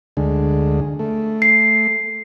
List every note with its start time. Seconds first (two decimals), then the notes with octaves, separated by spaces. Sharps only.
0.17 D2 D3 G#3
0.99 A3
1.42 C7